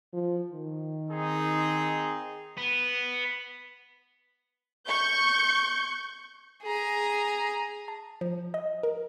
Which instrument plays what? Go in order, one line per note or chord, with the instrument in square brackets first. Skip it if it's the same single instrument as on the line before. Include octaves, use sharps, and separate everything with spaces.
[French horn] F3
D#3
[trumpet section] C4 D#4 G#4
[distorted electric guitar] B3
[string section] C#6 G6
[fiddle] G#4 A#5
[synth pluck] A5
F3
D#5
A#4